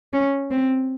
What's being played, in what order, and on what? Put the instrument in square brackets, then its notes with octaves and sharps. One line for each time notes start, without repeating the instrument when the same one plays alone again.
[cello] C#4
C4